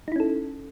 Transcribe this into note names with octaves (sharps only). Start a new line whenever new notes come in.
C#4 D#4 E4 A4